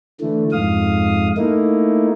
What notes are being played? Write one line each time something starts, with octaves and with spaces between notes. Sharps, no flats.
D3 E3 A3
F2 G#2 F5 D#6
A3 A#3 D#4 E4